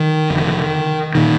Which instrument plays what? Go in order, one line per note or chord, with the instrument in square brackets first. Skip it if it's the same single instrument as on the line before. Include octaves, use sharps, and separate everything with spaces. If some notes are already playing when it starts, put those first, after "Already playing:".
Already playing: [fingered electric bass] D#3
F1 F2 D3
A#2 D#3